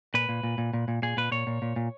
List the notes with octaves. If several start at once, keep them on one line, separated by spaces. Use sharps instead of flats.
A#2 B4
A#2
A#2
A#2
A#2
A#2
A#2 G#4
A#2 B4
A#2 C#5
A#2
A#2
A#2